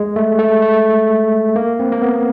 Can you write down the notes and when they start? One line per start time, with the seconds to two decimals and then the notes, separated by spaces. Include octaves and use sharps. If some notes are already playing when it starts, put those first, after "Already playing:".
Already playing: G#3
0.16 A3
0.39 A3
0.62 A3
1.56 A#3
1.79 C4
1.92 A#3
2.02 B3